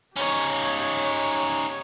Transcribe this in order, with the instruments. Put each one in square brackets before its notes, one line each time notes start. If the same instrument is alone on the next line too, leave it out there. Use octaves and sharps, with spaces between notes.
[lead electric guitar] C#4 D#4 [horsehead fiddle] G4 C#5